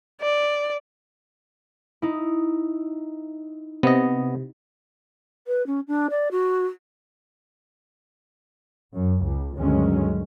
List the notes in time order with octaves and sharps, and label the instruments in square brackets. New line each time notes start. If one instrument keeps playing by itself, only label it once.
[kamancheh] D5
[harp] D#4 E4
[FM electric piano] C3 [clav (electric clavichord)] B3 D#5
[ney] B4
C#4
D4
D5
F#4
[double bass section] F#2
C#2
D2 G2 D#3 F#3 G#3 C#4